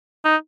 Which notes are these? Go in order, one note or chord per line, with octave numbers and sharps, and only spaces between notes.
D#4